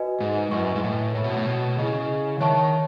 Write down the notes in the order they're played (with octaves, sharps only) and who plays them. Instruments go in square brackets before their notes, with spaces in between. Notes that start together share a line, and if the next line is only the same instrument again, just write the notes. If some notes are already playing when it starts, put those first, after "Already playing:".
Already playing: [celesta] F#4 B4 D#5 G#5
[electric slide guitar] G#2
[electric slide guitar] F#2 [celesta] E4 B4 D#5 G#5 C#6
[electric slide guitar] G#2
A2
[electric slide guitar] A2 [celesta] C#5 E5 B5
[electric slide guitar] B2
A2
B2
[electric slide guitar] C#3 [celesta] E4 G#4 D#5
[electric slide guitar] D#3 [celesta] C#5 E5 A5 C#6